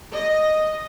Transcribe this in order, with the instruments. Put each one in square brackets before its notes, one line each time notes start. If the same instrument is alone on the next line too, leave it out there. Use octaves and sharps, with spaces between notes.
[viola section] D#5